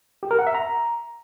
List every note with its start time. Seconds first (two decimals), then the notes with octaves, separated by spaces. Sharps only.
0.23 G4
0.31 A#4
0.39 F#5
0.47 E5
0.55 A#5